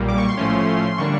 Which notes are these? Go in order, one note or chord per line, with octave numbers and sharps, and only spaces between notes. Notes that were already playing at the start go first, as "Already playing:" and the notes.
Already playing: B1 A#2 G3 A#3
D6
C#6
C6
A2 F3 A3 C#4
D3 G3 A#3 D4 C#6